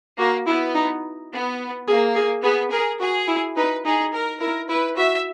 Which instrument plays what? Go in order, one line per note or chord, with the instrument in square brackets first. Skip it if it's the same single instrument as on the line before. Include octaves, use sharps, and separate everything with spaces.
[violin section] A#3 [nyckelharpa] F#4
[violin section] B3 [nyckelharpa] E4
[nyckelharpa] D#4
[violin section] B3
[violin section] A#3 [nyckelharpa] G#4
[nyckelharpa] G#4
[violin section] B3 [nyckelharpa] G#4
[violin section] G#4 [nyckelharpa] A#4
[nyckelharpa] F#4 [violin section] G#4
[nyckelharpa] E4
[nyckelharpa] D#4 [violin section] B4
[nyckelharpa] D#4 [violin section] G#4
[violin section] A#4
[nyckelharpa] E4 [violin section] A#4
[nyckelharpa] E4 [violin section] B4
[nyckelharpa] F#4 [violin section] E5